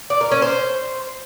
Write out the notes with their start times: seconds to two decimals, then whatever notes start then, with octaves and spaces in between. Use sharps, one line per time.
0.10 D5
0.21 A#4
0.31 C#4
0.42 C5